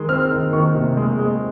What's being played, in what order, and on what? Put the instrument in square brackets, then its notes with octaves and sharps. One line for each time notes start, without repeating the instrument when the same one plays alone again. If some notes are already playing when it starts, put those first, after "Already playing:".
Already playing: [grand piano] D#3 G#3
C4 F6
D#3
D#3 C#6
C3
G#3
G#3